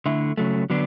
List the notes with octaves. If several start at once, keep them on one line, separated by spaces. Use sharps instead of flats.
D3 A3 E4
C#3 F#3 A3
D3 F#3 B3 D4